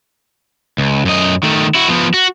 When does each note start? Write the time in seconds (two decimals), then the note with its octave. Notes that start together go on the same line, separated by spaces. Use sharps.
0.78 C#2
1.05 F#2 D#5
1.43 D#3 A3
1.75 E4 F#4
1.88 F3 B3
2.14 F#4